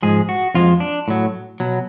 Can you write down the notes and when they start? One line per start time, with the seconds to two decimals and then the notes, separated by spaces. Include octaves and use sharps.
0.02 G#2 F3 G#3 G#4
0.29 F#4
0.54 F2 F3 G#3 F4
0.80 D4
1.08 A2 F#3
1.60 B2 F#3